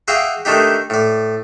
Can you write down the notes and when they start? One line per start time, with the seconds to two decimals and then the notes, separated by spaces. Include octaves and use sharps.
0.08 F#4 G#4 E5 F5 G5 D6
0.45 D#3 A3 D4 D#4 G4
0.90 A2 D5